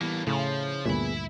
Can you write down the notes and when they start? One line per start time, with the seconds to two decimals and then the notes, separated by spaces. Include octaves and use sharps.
0.01 A2 E3 G3 A#3 B3
0.27 A2 C#3 F3 E4
0.86 D2 G2 A#2 B3 G#4 E5 B5